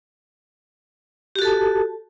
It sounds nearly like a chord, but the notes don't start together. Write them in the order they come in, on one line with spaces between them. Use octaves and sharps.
G4 F#4 A4 A5